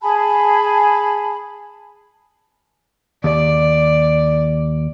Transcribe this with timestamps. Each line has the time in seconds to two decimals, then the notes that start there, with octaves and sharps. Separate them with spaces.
0.01 G#4 G#5 A5 B5
3.24 D#2 D5